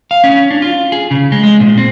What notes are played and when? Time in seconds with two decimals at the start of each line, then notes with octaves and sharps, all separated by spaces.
0.11 F5
0.24 C#4
0.51 D4
0.62 F4
0.92 G#4
1.11 C#3
1.32 G#3
1.43 G#3
1.60 A#2
1.78 C4